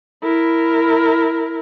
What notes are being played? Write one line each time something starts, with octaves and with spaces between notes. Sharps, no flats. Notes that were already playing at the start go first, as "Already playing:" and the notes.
E4 A#4